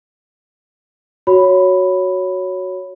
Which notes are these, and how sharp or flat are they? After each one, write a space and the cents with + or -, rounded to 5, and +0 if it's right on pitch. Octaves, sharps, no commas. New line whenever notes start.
F#4 +0 C#5 +5 B5 +0